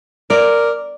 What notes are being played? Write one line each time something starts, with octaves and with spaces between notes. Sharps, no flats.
A#4 D5